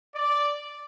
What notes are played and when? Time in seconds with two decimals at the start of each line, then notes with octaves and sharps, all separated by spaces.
0.15 D5